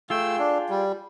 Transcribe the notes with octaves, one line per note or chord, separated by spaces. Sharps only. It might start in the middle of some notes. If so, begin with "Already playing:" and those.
A3 F4 G#4 G5 E6
D4
G3